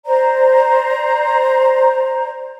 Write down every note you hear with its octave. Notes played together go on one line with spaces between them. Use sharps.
C5 D5 A#5